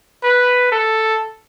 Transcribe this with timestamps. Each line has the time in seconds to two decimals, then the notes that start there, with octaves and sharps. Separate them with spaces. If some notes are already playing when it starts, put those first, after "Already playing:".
0.23 B4
0.72 A4